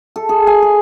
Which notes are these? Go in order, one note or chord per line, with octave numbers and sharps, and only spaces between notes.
A4
G#4
G#5
G#4